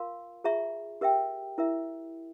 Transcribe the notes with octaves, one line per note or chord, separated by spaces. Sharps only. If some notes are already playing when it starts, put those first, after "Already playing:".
Already playing: F4 A#4 F5 C6
F4 G#4 E5 A#5 C#6
G4 A#4 E5 G5
E4 A#4 E5